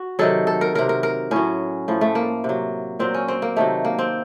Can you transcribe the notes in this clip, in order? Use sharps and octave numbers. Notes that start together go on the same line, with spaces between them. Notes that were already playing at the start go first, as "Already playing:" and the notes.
Already playing: F#4
C3 D#3 F#3 A4
A4
A#4
C3 F#3 A#4
A#4
A#4
A2 F#3 C#4
A2 F3
A3
A#3
C3 F#3
A#2 F#3 C4
C#4
C4
A#3
C3 D#3 F#3 A3
A#3
C4